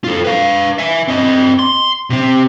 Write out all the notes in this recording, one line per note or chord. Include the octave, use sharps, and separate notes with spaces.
F4 A4
B4 F5
E5 G#5
C4 D#5
C6
C3 C4